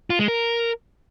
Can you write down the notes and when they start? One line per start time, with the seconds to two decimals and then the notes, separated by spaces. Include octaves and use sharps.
0.10 F4
0.19 G#3
0.28 A#4